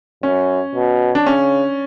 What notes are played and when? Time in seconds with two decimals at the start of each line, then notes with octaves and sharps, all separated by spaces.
0.23 F#2 C#4
0.75 B2
1.15 D4
1.26 C#3 C#4